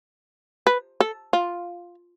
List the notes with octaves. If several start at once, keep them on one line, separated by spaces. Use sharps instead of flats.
B4
A4
F4